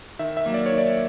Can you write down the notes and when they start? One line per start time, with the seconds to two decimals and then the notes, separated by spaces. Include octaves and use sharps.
0.19 D#3 E5
0.37 E5
0.46 F#3 A#3
0.54 D5
0.66 C#5
0.72 D#3
0.78 D5